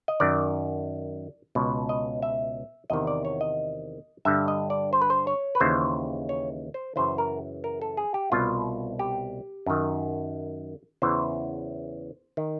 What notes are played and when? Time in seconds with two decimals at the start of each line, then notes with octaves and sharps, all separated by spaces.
0.08 D#5
0.20 F#2 D#3 D5
1.55 C#2 B2
1.89 D#5
2.23 E5
2.90 E2 C3 D#3 D#5
3.07 D5
3.25 C#5
3.41 D#5
4.25 G2 D3 E5
4.48 D#5
4.70 D5
4.93 C5
5.02 B4
5.10 C5
5.27 C#5
5.55 B4
5.60 D#2 C#3 E3 C5
6.29 C#5
6.74 C5
6.96 F#2 C#3 E3 C5
7.18 A#4
7.64 A#4
7.82 A4
7.97 G#4
8.14 G4
8.32 C2 B2 F4
8.99 G4
9.66 F#2 D#3
11.02 E2 C#3 E3 C5
12.37 D#3